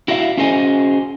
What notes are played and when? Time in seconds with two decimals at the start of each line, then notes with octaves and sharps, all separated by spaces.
0.08 E4 F#4 D5 E5 F5
0.38 C#4 F#4 G#4 C5 D#5 G#5